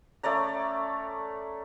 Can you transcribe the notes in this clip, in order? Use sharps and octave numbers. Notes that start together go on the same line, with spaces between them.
A3 C#4 D5 A#5